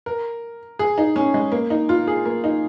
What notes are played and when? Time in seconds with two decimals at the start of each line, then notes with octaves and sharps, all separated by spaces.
0.06 A#4
0.79 G#4
0.98 D#4
1.16 C#4
1.34 G#3
1.52 A#3
1.70 D#4
1.89 F4
2.07 G#4
2.25 A#3
2.44 D#4